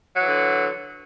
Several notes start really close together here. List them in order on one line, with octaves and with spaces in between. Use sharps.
F#3 E3 D3